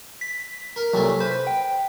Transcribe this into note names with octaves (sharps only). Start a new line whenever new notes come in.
B6
A#4
C2 A#2 F#3 A3
B4 C5
G5